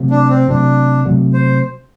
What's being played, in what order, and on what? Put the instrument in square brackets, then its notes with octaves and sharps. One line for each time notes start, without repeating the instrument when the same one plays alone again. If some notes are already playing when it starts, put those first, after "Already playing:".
Already playing: [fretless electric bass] C3 F#3 A3
[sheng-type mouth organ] D4
C4
[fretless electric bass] C3 F#3 A3 [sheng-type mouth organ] D4
[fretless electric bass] C3 F#3 A3
[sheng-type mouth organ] C5